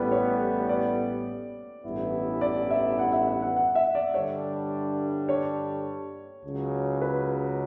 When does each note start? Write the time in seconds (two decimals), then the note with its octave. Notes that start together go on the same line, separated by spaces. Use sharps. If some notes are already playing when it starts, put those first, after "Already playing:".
Already playing: A1 A2 G3 B3 B4
0.11 C#5
0.69 D5
1.84 A1 G2 E3 B3 E4
2.41 D5
2.70 E5
2.99 F#5
3.13 E5
3.27 F#5
3.42 F#5
3.56 F#5
3.75 E5
3.95 D5
4.14 G2 D3 G3 D4 C#5
5.29 C#5
6.44 C#2 C#3 F#3
7.01 B4